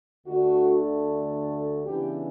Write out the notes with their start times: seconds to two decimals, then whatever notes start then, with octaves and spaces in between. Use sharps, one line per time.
0.25 D2 D3 A3 D4 F#4
1.84 C#3 E3 B3 D4 G4